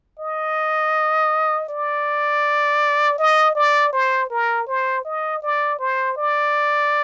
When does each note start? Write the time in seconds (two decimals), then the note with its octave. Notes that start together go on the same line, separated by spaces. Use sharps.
0.20 D#5
1.69 D5
3.19 D#5
3.55 D5
3.93 C5
4.30 A#4
4.68 C5
5.05 D#5
5.42 D5
5.79 C5
6.17 D5